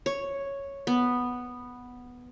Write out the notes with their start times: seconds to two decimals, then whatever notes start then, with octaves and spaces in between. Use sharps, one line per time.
0.06 C#5
0.87 B3